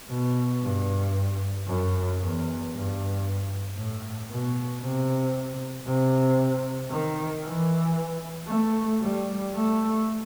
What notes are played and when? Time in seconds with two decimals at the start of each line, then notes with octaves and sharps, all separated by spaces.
0.10 B2
0.62 G2
1.67 F#2
2.20 E2
2.72 G2
3.77 A2
4.30 B2
4.82 C3
5.87 C3
6.91 D#3
7.45 E3
8.49 A3
9.02 G3
9.54 A3